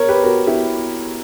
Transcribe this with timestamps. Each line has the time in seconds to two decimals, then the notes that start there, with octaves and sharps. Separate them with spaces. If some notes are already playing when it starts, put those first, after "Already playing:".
Already playing: A#4 C#5
0.08 G4 B4
0.23 F#4 A#4
0.47 E4 G4